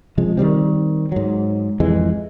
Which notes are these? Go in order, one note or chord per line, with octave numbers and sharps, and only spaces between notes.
C3 F3 G#3
D#3 F#3 G3 C4
G#2 F#3
F2 E3 G#3